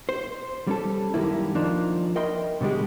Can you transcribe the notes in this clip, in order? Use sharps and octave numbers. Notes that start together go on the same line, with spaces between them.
C5
G3 C#4 A4
F#2 D#3 G3 A#3 E4
F3 A#3 D4 D#4
A#4 D#5 E5 G5 B5 C6
B2 D3 G3 G#3 G4